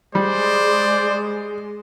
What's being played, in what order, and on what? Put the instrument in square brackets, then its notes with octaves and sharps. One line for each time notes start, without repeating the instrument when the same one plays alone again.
[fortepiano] G3 [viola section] G#3 [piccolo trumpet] C5 [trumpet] D5